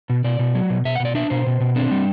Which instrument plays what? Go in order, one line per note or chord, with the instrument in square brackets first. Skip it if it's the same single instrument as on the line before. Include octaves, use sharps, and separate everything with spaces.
[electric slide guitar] B2
B2 D5
B2
F#3
B2
B2 E5
F#5
B2
D5
D4 E5
B2 C5
B2
B2
C4 D4
G3